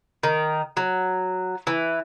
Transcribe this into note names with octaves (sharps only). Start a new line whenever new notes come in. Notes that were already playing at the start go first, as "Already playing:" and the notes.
D#3
F#3
E3